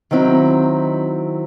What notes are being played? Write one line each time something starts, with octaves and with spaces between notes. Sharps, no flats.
D#3 F#3 C4 E4